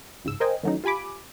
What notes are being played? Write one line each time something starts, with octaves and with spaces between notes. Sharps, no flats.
G1 C#2 G#2 E6
A#4 C5 D#5 G5 G#5
D#3 E3 F#3 A3 C#4 D#4
F4 G4 G#5 B5 D6